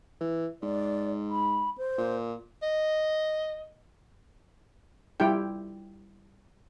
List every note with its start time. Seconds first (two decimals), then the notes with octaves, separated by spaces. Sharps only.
0.20 E3
0.62 G#2 D5
1.30 B5
1.78 C5
1.98 A#2
2.62 D#5
5.20 G3 E4 F4 G4 G5